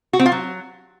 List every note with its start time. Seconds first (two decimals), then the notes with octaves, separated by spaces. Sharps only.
0.13 F#4
0.19 C4
0.26 F4
0.32 F#3